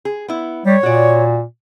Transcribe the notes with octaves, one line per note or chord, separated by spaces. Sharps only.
G#4
B3 E4
G3 C#5
A#2 F#4 D5